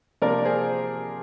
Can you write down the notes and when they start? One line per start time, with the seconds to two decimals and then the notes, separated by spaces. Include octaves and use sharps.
0.22 C3 F3 A#3 D4 A#4 D5
0.45 G#4 C5